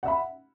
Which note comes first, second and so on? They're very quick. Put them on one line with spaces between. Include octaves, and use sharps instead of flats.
F#5 E5 B5